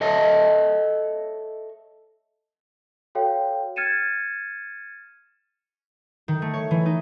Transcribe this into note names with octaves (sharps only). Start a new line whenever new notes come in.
A4 C#5 D#5 E5 A5
F#4 A4 C#5 F5 G5
F6 G#6 A6 C#7 D#7 E7
D#3
A3
C#5
E3
D#4